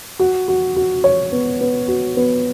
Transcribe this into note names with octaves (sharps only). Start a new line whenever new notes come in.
F#4
F#4
F#4
C#5
B3
B3
F#4
B3